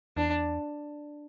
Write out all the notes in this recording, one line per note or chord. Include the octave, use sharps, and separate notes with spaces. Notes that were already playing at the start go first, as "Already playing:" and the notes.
E2 D4